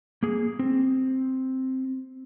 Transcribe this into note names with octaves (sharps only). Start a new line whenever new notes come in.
A#3 G#4
C4